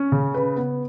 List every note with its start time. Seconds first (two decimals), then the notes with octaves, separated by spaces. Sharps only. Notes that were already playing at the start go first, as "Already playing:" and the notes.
Already playing: C#4
0.12 C#3
0.34 B4
0.56 B3